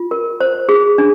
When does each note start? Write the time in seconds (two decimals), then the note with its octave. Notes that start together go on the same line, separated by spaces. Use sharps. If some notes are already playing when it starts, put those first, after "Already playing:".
Already playing: F4
0.11 A#4
0.41 C5
0.69 G#4
0.98 D4